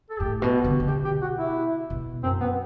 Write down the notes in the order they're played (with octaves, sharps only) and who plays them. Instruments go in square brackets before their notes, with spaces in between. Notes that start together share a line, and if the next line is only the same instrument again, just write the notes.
[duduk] A4
[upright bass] A2 [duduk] G4
[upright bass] B2
D3
C3
[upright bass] B2 [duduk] G4
[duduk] G4
F#4
E4
[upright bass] B2
[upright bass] F#2 [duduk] C4
[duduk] B3